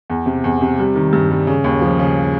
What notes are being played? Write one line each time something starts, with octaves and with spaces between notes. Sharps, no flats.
E2
C3
E2
C3
G3
D#3
G2
G3
C#3
D#2
F3
C#3